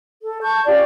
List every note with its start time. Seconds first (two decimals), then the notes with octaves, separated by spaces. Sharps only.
0.20 A4
0.42 A5 C#6 G6
0.65 C#4 F4 G4 D5